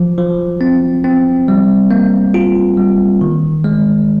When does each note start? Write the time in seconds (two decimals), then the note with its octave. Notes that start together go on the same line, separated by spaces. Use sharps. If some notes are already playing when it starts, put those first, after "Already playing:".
Already playing: F3
0.18 F3
0.61 C4
1.04 C4
1.48 G3
1.91 A#3
2.34 F4
2.78 G3
3.21 D#3
3.64 G#3